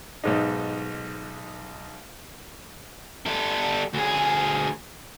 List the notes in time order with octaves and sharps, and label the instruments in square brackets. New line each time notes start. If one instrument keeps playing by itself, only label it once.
[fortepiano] B1 G#2 D#4
[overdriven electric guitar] G3 A4
D2 G#4